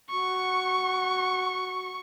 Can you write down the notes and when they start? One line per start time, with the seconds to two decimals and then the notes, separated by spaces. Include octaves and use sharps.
0.10 F#4 C#6